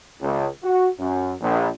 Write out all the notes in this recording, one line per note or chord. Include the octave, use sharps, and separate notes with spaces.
C#2
F#4
F#2
A#1